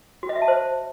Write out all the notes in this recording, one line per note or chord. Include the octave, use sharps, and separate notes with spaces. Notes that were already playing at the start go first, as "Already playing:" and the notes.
F#4
D#5
E5
A5
C5